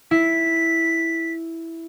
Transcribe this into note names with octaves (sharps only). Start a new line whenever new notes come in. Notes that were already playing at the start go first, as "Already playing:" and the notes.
E4 B6